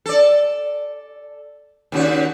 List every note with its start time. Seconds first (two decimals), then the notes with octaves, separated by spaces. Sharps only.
0.06 A4 D5
1.92 D#2 C#3 F#4